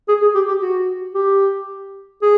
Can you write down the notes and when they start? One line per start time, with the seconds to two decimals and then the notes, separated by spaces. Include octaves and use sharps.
0.08 G#4
0.22 G#4
0.35 G4
0.48 G4
0.62 F#4
1.14 G4
2.22 G#4